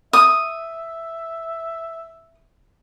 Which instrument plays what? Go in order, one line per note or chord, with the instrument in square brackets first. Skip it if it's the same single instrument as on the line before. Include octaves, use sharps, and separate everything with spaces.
[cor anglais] E5 [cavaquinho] D#6